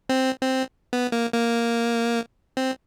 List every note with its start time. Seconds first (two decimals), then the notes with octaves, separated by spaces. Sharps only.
0.09 C4
0.41 C4
0.93 B3
1.12 A#3
1.34 A#3
2.57 C4